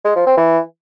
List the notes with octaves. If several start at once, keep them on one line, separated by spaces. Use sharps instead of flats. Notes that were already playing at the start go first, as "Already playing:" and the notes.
G#3
F3
C4
E3